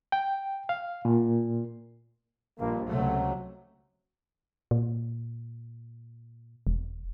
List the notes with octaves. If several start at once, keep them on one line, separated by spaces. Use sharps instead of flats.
G5
F5
A#2
A#1 G2 A#2 A#3
C#2 C3 F#3 A3
A#2
E1